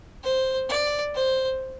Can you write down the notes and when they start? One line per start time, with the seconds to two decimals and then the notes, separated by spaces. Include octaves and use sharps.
0.23 C5
0.69 D5
1.14 C5